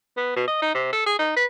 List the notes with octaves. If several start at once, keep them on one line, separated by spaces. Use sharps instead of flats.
B3
B2
D#5
D#4
C3
A4
G#4
D#4
B4